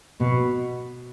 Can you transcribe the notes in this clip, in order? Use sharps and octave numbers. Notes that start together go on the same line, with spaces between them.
B2